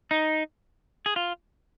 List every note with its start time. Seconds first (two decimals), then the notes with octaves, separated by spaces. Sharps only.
0.11 D#4
1.06 G#4
1.16 F4